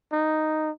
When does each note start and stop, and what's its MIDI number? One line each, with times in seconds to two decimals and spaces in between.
0.13 0.71 63